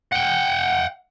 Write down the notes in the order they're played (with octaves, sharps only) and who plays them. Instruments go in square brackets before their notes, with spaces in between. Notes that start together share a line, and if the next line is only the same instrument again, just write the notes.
[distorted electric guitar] F#5 G5